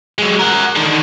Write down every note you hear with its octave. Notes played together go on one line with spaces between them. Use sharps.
F#3 G#3
A#4 F#5
D3 D#3